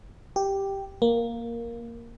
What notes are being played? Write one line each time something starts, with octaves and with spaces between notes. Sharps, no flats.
G4
A#3